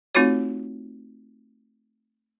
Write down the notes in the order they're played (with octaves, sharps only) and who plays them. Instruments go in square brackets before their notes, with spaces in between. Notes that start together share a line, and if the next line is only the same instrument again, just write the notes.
[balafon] A3 C4 D#4 F4 F#4 C#5